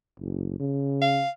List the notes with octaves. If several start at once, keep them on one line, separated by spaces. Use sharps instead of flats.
F#1
C#3
F5